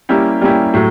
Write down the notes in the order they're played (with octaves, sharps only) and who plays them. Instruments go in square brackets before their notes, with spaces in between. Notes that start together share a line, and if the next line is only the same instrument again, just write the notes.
[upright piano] G3 A#3 C#4 E4 G4
G3 A#3 C#4 E4 G4
A2 F#3